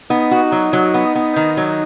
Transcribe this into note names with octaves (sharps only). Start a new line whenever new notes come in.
B3 D#4
F#4
F#3
F#3
B3
B3
D#3
F#3